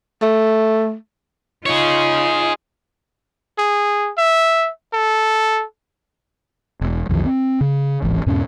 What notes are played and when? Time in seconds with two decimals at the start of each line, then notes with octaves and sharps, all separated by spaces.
0.22 A3
1.66 D#4 F4 G#4 C#5
3.58 G#4
4.17 E5
4.93 A4
6.81 E1
7.09 B1 F2 D#3 F3
7.25 C4
7.61 C#3
8.02 D1 G#1 E3
8.26 E2 G#2 B2 C#4